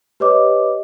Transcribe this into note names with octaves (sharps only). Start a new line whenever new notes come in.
G4 B4 C#5 D#5 D6